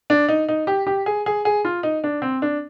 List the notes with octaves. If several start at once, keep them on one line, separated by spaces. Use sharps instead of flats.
D4
D#4
D#4
G4
G4
G#4
G#4
G#4
F4
D#4
D4
C4
D4